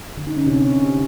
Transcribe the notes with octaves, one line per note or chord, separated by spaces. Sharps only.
D3
D#4
C#4
C3
C#4